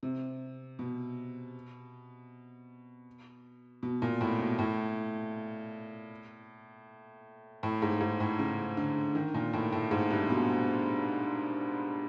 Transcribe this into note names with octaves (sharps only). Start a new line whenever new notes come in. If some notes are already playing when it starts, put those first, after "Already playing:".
C3
B2
B2
A#2
A2
B2
A2
A2
G#2
G#2
A2
C#3
D3
D#3
A#2
A2
A2
G#2
G2
B2